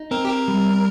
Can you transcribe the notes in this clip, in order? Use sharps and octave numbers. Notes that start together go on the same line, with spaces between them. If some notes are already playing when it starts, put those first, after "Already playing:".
Already playing: D#4
C4 A#4
G4
A#4
G3